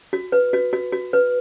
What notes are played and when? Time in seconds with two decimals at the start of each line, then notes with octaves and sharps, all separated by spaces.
0.13 F#4
0.32 B4
0.53 F#4
0.73 F#4
0.92 F#4
1.13 B4